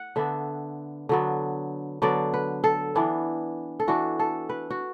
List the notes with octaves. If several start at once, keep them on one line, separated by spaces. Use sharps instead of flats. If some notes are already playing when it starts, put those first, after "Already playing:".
Already playing: F#5
D3 B3 D4 E5
D3 F#3 B3
D3 F#3 B3 D5
B4
A4
E3 B3 D4
A4
E3 B3 D4 F#4
A4
B4
F#4